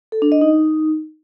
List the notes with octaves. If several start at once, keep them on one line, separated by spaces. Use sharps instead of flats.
A4
D4
D#5
D#4